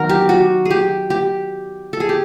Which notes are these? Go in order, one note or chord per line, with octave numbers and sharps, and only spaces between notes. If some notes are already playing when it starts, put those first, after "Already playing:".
Already playing: D#3 F#3 B3 A#4
G4
F#4
G#4
G4
G4
A4
G#4
G4